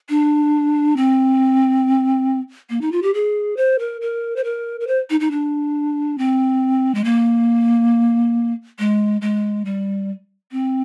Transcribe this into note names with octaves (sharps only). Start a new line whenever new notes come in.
D4
C4
A#3
D#4
F4
G4
G#4
C5
A#4
A#4
C5
A#4
A#4
C5
D#4
D#4
D4
C4
G#3
A#3
G#3
G#3
G3
C4